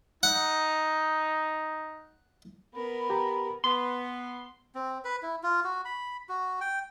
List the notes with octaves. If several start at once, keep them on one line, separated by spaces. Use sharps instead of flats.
D#4 F#5
B3 A#4 B5
G4 A#5
B3 C6
C4
B4
E4
F4
F#4
B5
F#4
G5